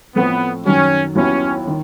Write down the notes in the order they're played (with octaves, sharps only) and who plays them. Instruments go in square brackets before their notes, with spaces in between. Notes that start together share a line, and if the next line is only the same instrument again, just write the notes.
[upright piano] A2 F3 A3 C4 [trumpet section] B3
[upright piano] F#2 D#3 F#3 [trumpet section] C#4
[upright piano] D#2 D#3 F#3 B3 E4 [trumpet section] C#4
[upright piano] D#3